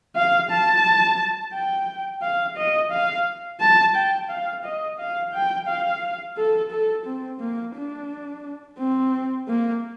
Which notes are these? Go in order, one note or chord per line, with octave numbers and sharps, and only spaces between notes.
F5
A5
G5
F5
D#5
F5
A5
G5
F5
D#5
F5
G5
F5
A4
A4
C4
A#3
D4
C4
A#3